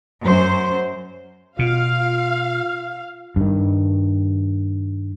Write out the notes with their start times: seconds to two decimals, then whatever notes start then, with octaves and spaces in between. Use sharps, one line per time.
0.24 F#2 C5
1.59 B2 F4 F5
3.36 G2 D#3